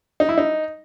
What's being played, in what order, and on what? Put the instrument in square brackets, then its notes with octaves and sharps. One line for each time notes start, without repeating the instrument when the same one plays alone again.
[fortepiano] D#4
E4
D#4